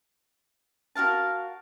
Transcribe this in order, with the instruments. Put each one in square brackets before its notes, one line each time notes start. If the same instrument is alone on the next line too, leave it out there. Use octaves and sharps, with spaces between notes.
[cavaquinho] F#4 A#4 F5 A5